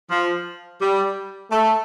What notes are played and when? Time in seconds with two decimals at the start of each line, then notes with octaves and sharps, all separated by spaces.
0.10 F3
0.81 G3
1.51 A3